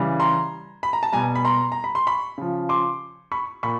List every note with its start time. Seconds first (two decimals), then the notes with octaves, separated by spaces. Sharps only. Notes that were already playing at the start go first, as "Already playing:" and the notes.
Already playing: C#3 E3 G3
0.20 A#5 C6
0.83 B5
0.93 A#5
1.03 A5
1.13 B2 G3 G#5 A#5
1.35 B5
1.45 A#5 C6
1.72 A#5
1.84 B5
1.95 C6
2.07 B5 C#6
2.38 C#3 F3
2.69 C6 D6
3.32 B5 C#6
3.63 A#2 B5 C#6